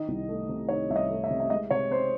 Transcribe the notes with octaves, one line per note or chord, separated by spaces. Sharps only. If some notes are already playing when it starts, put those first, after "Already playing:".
Already playing: D#3 D#5
C2
A3
C3
D#3 C#5
C2 E5
D#5
A3
E5
C3
E5
G#3 D#5
C3 C#5
C4 C5